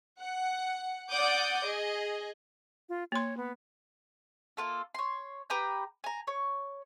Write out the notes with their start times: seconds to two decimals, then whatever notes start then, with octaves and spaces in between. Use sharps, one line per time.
0.22 F#5
1.11 D5 F#5 D6 D#6 G6
1.65 G#4 D#5
2.89 F4
3.12 A#3 C#5 C6
3.37 B3
4.57 A#3 F4 A4
4.95 C#5 C6
5.50 G4 B4 A#5 G6
6.04 G#5 A#5
6.27 C#5